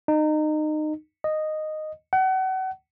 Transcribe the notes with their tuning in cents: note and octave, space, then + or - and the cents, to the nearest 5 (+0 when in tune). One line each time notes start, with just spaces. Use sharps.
D#4 -25
D#5 -10
F#5 +35